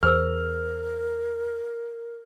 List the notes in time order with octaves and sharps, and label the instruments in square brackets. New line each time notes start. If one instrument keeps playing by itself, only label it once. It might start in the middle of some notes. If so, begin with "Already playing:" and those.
[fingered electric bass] E2 [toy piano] G#4 C5 E6 [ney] A#4 [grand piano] F6